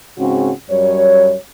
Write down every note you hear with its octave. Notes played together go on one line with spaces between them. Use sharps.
G#2 C#3 C4 C#4 F#4
F#2 G3 C#5